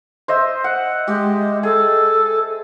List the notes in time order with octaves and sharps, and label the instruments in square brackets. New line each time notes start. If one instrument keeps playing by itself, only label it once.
[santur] C5 D#5 E5
F#5
[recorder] G#3 [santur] G4
[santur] G#4 [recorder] A4